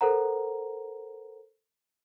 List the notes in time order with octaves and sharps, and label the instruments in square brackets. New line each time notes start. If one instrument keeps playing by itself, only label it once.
[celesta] A4 A#4 C5 F#5 A#5